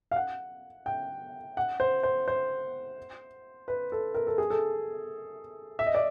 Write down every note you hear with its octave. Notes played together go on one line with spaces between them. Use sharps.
F5
F#5
G5
F#5
C5
C5
C5
B4
A4
A#4
A4
G#4
A4
E5
D#5
D5